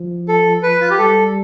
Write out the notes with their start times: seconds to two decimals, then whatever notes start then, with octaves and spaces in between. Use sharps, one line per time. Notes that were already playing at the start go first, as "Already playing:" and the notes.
Already playing: F3
0.28 A4
0.63 B4
0.81 F4
0.90 G4
0.99 G3 A4